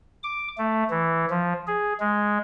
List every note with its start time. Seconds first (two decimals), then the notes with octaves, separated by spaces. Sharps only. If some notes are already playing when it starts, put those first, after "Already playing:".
0.23 D6
0.58 A3
0.91 E3
1.30 F3
1.68 G#4
2.00 G#3